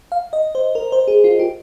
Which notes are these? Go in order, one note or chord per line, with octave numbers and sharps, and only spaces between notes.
F5
D#5
C5
A#4
C5
G#4
F4
G4